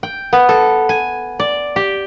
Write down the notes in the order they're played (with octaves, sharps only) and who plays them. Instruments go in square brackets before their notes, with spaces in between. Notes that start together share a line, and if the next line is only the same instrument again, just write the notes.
[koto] G5
B3
A4
G#5
D5
G4